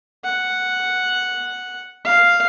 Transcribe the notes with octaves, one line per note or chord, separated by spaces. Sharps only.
F#5
F5